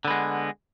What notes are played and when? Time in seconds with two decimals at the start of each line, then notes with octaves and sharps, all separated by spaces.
0.05 D3
0.07 B3
0.10 G#3